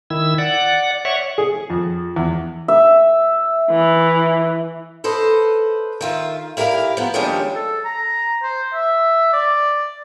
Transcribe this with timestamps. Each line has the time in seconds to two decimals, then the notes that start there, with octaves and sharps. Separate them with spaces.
0.10 D#3 E4 E6
0.38 D5 F#5
1.05 C#5 D5 E5 F#5 C#6
1.38 G#4
1.70 F2
2.16 E2
2.68 E5
3.70 E3
5.04 A4 B4 C5 D#5
6.01 D#3 F4 E5
6.57 G3 E4 A#4 D5 F5
6.97 F3 B3
7.14 D#3 F3 G3 G#3 C#4 D4
7.54 A4
7.85 A#5
8.43 C5
8.73 E5
9.33 D5